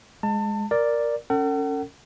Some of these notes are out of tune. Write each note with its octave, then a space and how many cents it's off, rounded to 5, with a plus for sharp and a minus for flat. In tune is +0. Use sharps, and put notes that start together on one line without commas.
G#3 +0 A5 +30
A#4 +0 D5 +0
C#4 +0 A4 +45 F#5 +40